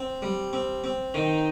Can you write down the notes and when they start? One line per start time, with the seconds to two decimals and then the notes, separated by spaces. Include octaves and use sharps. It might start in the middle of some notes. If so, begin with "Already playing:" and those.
Already playing: C4
0.22 G3
0.53 C4
0.84 C4
1.14 D#3 D#4